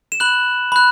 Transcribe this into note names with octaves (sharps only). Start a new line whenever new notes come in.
E7
B5 F#6 F#7
B5 F#6